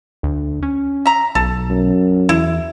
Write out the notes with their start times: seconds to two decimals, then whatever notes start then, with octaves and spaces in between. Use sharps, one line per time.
0.23 D2
0.63 C#4
1.06 E5 A#5
1.35 B1 A4
1.70 F#2
2.29 E2 E4